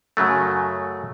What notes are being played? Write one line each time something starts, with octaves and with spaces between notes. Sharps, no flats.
F#2 C#3 F#3 A3